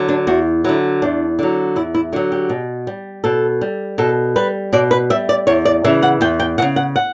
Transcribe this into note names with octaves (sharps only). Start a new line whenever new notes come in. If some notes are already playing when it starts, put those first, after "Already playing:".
Already playing: D3 F#3
D4
E2 F#4
D3 F#3 E4
E2 D4
D3 F#3
E2 E4
E4
D3 F#3 F#4
G4
B2
G3
B2 A4
G3
B2 A4
G3 B4
B2 D5
B4
G3 E5
D5
E2 C#5
D5
C#3 E3 E5
F#5
E2 G5
G5
E3 F#5
C#3
F#5
F#5